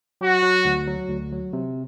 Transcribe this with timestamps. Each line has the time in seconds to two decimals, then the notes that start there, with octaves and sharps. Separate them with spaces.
0.21 F#3 F#4
0.43 F#3
0.65 D2
0.87 F#3
1.09 D2
1.32 F#3
1.53 C3